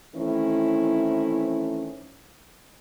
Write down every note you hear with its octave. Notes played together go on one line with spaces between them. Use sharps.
D#3 E3 A3 C4 C#4 E4